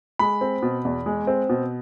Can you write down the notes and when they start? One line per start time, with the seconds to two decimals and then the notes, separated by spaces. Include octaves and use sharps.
0.19 G#3 B5
0.41 C4
0.62 B2
0.85 E2
1.06 G#3
1.27 C4
1.50 B2